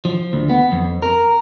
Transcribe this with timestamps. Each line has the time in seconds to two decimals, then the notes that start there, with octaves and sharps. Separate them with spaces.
0.05 F3
0.33 D2
0.49 B3
0.72 F2
1.02 A#4